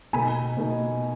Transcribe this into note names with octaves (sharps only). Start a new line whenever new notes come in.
B2 A#3 D#4 G#5 B5
B2 A#3 D#4